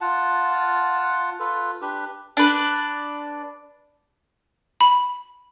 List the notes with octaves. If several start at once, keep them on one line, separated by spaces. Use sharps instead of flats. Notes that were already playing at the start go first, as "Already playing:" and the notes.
F4 F#5 A5
F4 A4 B4
D4 G4 B4
D4 B4
B5